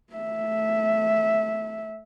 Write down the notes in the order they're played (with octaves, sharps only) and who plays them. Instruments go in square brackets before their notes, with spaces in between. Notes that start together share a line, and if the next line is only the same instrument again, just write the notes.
[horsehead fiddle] A3 E5